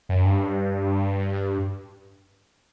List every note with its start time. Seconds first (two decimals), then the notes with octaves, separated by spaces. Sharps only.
0.09 F#2
0.25 G2